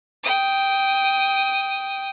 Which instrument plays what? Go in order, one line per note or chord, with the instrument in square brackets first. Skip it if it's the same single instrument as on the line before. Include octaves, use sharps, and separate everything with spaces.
[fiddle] G5 D#6